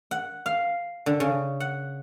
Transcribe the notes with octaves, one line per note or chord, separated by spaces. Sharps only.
F#5
F5
D3
C#3
F#5